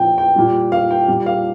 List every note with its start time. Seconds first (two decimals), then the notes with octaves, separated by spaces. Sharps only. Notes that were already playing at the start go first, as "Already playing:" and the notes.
Already playing: A#2 F3 G5
0.18 G5
0.36 A#2 G3
0.72 F5
0.91 G5
1.08 A#2 G3
1.26 F5